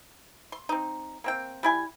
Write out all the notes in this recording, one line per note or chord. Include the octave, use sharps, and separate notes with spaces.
C6
C4 D#4
A#3 C4 G5
G3 E4 G#5